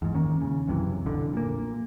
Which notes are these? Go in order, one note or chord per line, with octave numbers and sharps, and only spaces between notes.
E2 G#2
D#3 A#3 C#4
C#3
B1 F#2 C3 E3
B1 F2 D3
A#2 A#3